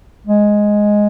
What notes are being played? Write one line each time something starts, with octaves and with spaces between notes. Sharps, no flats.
G#3